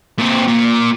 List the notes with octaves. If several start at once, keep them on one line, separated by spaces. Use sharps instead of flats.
A#2 C4
A#2